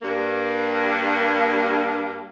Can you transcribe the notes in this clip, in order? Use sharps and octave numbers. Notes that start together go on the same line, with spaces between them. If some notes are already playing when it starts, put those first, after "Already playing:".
G2 A#3